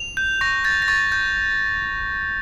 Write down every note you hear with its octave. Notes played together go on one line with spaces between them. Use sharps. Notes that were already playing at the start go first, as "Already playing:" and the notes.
Already playing: F7
G6
C#6 A#6
G6 A6
A#6
C#6 A6
G6